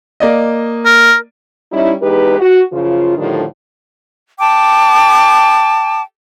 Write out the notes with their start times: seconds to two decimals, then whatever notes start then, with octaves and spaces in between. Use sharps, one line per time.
0.20 A#3 D5 D#5
0.85 A#4
1.72 G3 C#4 D#4 E4
2.01 E2 G#3 D#4 G4 B4
2.40 F#4
2.72 F#2 C#3 F3 F4
3.17 A2 D3 D#3 F3 G3 D4
4.39 G5 A5 D6